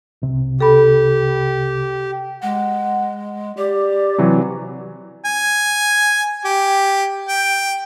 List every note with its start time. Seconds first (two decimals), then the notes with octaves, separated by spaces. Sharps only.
0.22 C2 C3
0.60 G4 A4 B5
2.42 G#3 F#5
3.57 G4 D5
4.18 C3 E3 F#3
5.25 G#5
6.45 G4
7.28 G5